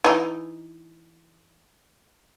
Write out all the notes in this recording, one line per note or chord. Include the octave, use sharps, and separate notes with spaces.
E3 D#4